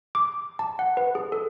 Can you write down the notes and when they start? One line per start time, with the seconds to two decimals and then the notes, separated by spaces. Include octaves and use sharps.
0.15 D6
0.59 A5
0.79 F#5
0.97 B4
1.15 G#4
1.32 A4